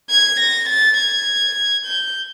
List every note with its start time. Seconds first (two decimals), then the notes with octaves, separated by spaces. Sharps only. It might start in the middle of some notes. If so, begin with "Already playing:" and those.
0.10 G#6
0.40 A#6
0.69 A6
0.98 G#6
1.86 G6